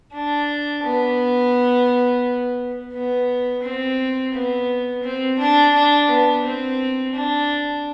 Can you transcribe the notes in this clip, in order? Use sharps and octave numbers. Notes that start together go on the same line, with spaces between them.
D4
B3
B3
C4
B3
C4
D4
D4
B3
C4
D4